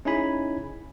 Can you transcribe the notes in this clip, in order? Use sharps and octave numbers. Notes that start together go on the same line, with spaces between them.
C#4 D#4 E4 G#4 G#5 B5